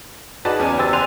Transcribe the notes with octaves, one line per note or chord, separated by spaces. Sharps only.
D#4 F#4 G#4 B4 D5 A5
E2 C#4 G#5
E2 G4 C5 E6 A6
G#5 C6 F#6 D#7 F7